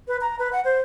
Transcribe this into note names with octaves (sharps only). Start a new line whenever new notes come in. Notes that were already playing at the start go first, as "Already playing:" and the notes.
B4
A#5
B4
F#5
C5